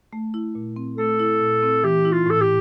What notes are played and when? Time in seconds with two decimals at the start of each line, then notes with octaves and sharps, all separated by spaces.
0.13 A3
0.34 E4
0.55 A#2
0.76 C4
0.97 A3 A4
1.19 E4
1.41 A#2
1.62 C4
1.83 E3 G4
2.05 E4
2.12 F4
2.26 A2 A4
2.41 G4